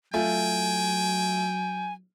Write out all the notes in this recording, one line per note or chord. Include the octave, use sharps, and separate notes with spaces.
F#3 A3 F4 G5 G#5